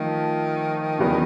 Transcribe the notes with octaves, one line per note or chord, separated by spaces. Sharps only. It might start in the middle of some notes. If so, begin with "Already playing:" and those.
Already playing: D#3 F3 A3
E2 C#3 F#3 B3